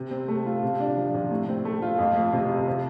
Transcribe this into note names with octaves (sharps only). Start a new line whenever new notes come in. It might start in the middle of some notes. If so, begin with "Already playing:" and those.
Already playing: C3
C4
A3
F4
C3
D4
F3
C3
A2
C4
A3
F4
F2
A3
C3
F4
C3